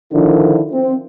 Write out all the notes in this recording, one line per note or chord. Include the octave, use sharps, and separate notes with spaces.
D3 D#3 F3 D4 E4 A#4
C4